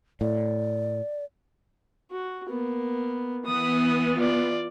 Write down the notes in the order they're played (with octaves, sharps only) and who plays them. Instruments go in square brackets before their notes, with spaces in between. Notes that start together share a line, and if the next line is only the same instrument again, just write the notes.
[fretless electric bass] A2 [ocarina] D5
[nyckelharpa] F#4
A#3 B3
[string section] E3 B3 [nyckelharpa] D#6
[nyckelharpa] F4 D5